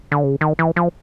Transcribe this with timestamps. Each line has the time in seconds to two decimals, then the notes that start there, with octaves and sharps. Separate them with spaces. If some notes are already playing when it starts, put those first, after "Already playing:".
0.12 D3
0.24 C#3
0.41 D#3
0.59 E3
0.76 F3